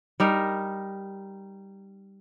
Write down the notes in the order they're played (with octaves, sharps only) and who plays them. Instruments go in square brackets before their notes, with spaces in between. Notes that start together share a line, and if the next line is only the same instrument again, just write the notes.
[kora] G3 D#4 A#4